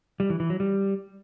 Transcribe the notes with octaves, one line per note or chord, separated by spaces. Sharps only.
G3
E3
E3
F#3
G3